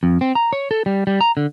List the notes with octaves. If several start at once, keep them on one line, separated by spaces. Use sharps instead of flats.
F2
C4
A#5
C#5
A4
G3
G3
A#5
D3